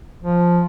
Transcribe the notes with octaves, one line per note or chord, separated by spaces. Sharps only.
F3